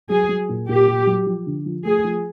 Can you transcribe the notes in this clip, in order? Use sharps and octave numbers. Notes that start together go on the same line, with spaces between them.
F#3 G#4
F#3
A#2
A#2 G4
A#2
F#3
F3
D3
F3
A3 G#4
F3